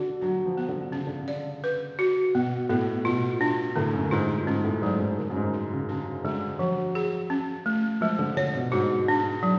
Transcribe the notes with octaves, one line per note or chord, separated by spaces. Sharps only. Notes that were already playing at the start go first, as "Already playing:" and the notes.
Already playing: D3 F#4
F#3 D4
F3
B3
D3
C#3 C#4
D3
C#3
D5
B4
F#4
B2 B3
A2 B3
B2 F4
D4
A2 D3
F#2
G#2 F4
G#2 C#4
A2
G#2 F#3
G#2
D3
F#2
G#2
D3
C#3
C#3 D4
D3 G#3
F3 F#3
G#4
C#4
A3
F3 G#3
D3
D3 C#5
B2
G#2 F#4
D4
F#3